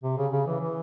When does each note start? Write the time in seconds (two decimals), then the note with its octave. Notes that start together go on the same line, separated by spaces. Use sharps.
0.03 C3
0.17 C#3
0.32 C#3
0.47 E3
0.60 E3